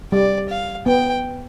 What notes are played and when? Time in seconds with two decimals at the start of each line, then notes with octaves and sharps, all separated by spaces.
0.12 G3 D5
0.50 F5
0.86 B3 G5